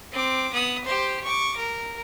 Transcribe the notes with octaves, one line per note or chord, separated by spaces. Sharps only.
C4 D6
B3 D#6
G4 C5
C#6 D6
A#4